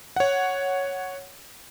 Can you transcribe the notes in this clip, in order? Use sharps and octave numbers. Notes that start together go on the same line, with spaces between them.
C#5 F#5